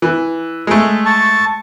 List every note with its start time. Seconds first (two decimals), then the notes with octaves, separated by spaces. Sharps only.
0.02 E3
0.67 G#3 A3
1.05 A5 C#6